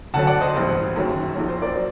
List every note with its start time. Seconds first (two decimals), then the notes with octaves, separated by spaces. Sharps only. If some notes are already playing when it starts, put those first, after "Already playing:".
0.14 D2 D3 F#3 F#5 A5
0.27 D5 F#5
0.41 C5 D#5
0.54 A1 G2 F#3 C5
0.95 F#1 F#2 D#3 F#3
1.35 A#1 A#2 F#3
1.48 C5
1.62 A#4 D5
1.75 F#3